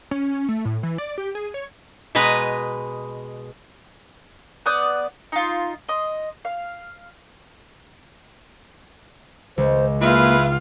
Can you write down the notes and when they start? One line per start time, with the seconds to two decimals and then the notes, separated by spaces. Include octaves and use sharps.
0.11 C#4
0.49 A3
0.65 A2
0.83 E3
0.98 D5
1.18 G4
1.35 G#4
1.54 C#5
2.15 B2 G#3 B4 D#5 A#5
4.66 B3 D5 D#6 G6
5.32 D#4 F4
5.89 D#5 C6
6.45 F5
9.58 C#2 C5
10.01 G#3 A#3 E4 F4 B4 F5